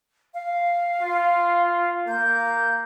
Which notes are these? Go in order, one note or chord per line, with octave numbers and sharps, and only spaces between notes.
F5
F4
A#3 G6